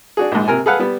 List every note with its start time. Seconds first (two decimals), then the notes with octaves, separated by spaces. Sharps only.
0.17 D4 F#4 G#4
0.32 A#1 G#2
0.48 C3 A#4 G#5
0.66 G#4 A4 B4 F5 F#5
0.79 G3 B3